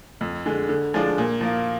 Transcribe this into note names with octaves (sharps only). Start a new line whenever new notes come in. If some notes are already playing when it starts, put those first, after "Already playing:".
F2
D3 G#3
D3
F3 G#3 D4
A#2
F3 A#3